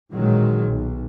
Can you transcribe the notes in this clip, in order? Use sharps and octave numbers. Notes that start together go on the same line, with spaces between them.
A1 A#2 D#3 F#3 G#3
B1